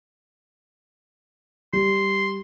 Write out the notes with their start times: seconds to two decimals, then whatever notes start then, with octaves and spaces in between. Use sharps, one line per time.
1.73 G3 C6